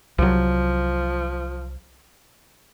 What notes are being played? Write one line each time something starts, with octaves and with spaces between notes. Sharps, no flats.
C2 F3 F#3